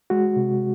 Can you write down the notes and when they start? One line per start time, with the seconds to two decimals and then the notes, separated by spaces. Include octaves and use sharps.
0.10 G#3 F#4
0.36 C3